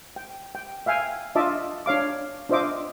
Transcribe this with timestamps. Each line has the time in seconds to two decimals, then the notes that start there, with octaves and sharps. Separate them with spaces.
0.16 G5
0.55 G5
0.86 E5 F5 G5 G#5
1.35 D4 F4 D#5 E5 A5 D6
1.86 D4 C#5 F5 D6
2.49 D4 F4 C5 D#5 E5 D6